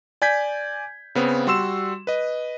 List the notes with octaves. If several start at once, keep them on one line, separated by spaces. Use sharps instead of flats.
D5 G#5 G6 G#6 B6
C#3 B3 C4
G3 F#4 C6 E6 E7
B4 D#5